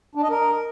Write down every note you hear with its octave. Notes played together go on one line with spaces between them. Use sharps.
D4
D#5
A#4